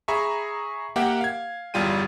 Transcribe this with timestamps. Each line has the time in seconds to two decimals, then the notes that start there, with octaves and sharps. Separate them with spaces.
0.08 G#4 E5 A#5 B5 C#6
0.96 A#3 G4 E5 F#5 G5
1.21 F5 G#6
1.74 G1 E2 G3 F4 G5 D#7